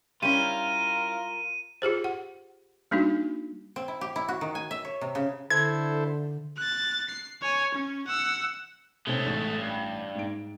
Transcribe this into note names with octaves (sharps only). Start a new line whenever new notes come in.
G3 C#4 E4 F4 A#4 D#7
F4 G4 G#4 C5
F#5
G3 A#3 D4 D#4 F#4
C4
E4
G4
E4
F#4
D#3
G#5
E5
C#5
C3
C#3
D3 E4 A4 C5 G#6
F#6 A6
C7
C#5 G#5
C#4
F#5 E6
C3 G#3 A3 C4 C#4
A1 C#6
G2
G#2 D7